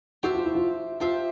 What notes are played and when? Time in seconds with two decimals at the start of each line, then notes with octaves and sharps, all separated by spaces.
0.23 F#4 G4 C5 E5 A5
0.34 F4
0.44 E4
0.55 F4
1.00 F4 G4 C5 E5 A5